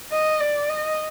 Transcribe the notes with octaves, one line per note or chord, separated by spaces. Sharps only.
D#5
D5
D#5